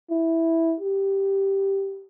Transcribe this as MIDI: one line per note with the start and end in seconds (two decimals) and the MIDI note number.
0.10 0.75 64
0.80 2.05 67